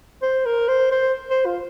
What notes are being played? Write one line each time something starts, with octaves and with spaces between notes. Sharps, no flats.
C5
A#4
C5
C5
C5
F4